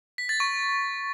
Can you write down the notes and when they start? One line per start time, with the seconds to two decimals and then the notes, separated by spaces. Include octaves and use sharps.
0.18 B6
0.29 A6
0.40 C#6